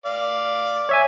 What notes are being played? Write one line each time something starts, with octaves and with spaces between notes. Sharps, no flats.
D5 F5
C#5 E5 G#5